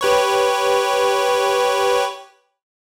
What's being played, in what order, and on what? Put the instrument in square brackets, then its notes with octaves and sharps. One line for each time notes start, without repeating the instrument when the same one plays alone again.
[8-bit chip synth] G4 B4 C#5